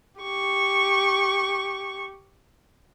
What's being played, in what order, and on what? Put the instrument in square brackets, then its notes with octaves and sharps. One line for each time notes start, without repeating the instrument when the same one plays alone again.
[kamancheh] G4 C#6